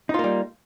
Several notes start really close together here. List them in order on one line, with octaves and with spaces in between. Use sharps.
D#4 F4 A#3 G3